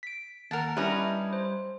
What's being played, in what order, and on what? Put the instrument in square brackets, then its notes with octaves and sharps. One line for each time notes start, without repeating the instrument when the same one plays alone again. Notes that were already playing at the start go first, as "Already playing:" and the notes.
[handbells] B6 D7
[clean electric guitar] D#2 [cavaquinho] A#4 F#5 A5
[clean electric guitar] G3 [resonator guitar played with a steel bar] C#4 D4 E4 [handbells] G4 A#5 [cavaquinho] B4 D#5
[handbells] C5